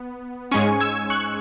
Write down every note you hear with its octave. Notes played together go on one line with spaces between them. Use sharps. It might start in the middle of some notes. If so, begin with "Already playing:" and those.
Already playing: B3
G#2 G#3 C#4 G#5 C#6
E6 G#6
C#6 F#6